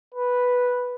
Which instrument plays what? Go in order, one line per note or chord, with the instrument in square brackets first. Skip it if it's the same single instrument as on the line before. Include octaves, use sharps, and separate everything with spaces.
[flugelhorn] B4